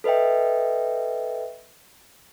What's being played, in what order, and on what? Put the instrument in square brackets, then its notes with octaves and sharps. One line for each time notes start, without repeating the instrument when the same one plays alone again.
[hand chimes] A4 B4 D#5 E5 G5